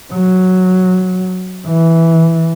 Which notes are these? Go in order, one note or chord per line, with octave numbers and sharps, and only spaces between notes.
F#3
E3